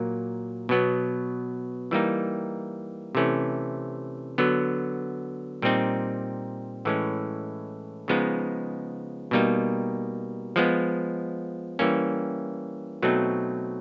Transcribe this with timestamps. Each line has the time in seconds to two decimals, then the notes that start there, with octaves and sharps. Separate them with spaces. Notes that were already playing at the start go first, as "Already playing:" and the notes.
Already playing: A#2 F#3 A#3
0.69 B2 F#3 B3
1.91 E3 G3 A#3 D#4
3.15 C3 E3 A3 C#4
4.38 D3 F#3 B3
5.62 A#2 G3 C4 D#4
6.85 A2 E3 G#3 C#4
8.08 C#3 F3 G#3 B3 D#4
9.31 B2 G3 A#3 D#4
10.56 F3 G#3 B3
11.79 E3 G3 A#3 C#4
13.02 B2 F#3 A3 C4 D#4